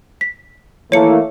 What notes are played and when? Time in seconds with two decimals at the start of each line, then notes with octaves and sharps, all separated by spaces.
0.21 B6
0.92 E3 A3 A#3 C#5 C#7